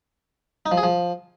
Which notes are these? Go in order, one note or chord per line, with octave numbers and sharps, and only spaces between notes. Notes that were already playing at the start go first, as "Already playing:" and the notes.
D#4
F3
G#4
F3